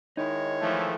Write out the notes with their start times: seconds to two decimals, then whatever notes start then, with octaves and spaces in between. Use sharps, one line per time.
0.17 D#3 G#3 D#4 E4 C#5
0.61 E3 F3 A3